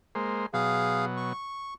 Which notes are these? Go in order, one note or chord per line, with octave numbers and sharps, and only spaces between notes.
G#3 A#3 C5
B2 F#3 G#4 F5
C#6